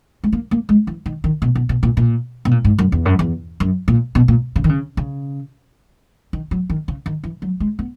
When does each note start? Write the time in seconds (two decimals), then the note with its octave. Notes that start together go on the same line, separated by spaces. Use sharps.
0.24 G#3
0.33 A#3
0.51 A#3
0.69 G#3
0.87 E3
1.06 D#3
1.24 D#3
1.42 B2
1.55 B2
1.69 B2
1.83 A#2
1.97 A#2
2.45 B2
2.51 A#2
2.65 G#2
2.79 F#2
2.92 E2
3.05 F#2
3.19 E2
3.60 F#2
3.88 A#2
4.15 B2
4.28 A#2
4.56 C#3
4.64 D#3
4.69 C#3
4.97 C#3
6.33 D#3
6.51 F#3
6.70 D#3
6.88 C#3
7.06 D#3
7.24 E3
7.42 F#3
7.60 G#3
7.79 B3